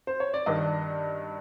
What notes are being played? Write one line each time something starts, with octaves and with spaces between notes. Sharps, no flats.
C5
C#5
D5
G2 D#3 D#5